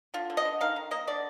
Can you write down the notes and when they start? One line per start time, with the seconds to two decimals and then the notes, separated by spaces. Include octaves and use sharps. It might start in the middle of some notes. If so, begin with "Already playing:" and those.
0.14 D3 F4
0.30 D3
0.37 D#5
0.45 D3
0.61 D#3 F5
0.76 D#3
0.91 A#3 D#5
1.07 D3 D5